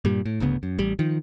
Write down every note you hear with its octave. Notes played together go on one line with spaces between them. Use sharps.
G2 A#2 G3
A2
G1 D2 C#3 B3
F#2
A1 G3
D#3 F3